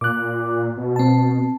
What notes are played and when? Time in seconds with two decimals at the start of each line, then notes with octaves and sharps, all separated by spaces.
0.01 A#2 D6 F#6
0.77 B2
0.96 C4 A5